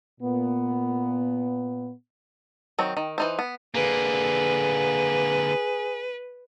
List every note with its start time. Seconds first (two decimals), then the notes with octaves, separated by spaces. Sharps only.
0.21 A#2 B3
2.79 D#3 F#3 C4
2.97 D#3
3.18 E3 D#4 C5
3.39 B3
3.75 D3 A#3 G#4 B4